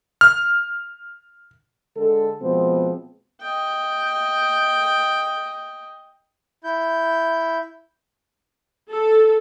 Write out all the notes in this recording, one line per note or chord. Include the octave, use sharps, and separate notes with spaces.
F6
D3 G#3 A4
B2 F3 G#3 B3 C4
D#5 G5
E4 G6
A4